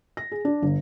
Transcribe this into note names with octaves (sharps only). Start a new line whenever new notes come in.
A#6
G#4
D4
G1